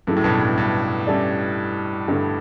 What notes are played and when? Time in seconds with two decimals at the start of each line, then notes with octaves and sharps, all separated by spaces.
0.07 G2 C#3 F#3 A3 E4
0.17 A2
0.24 G2 B2
0.41 G2
0.58 G2
1.07 G3 C#4 E4 A4 D5
2.08 G2 D3 A3